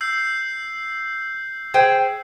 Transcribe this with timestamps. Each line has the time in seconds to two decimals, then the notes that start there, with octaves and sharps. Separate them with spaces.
0.01 E6 G6 C7
1.74 G#4 C5 G5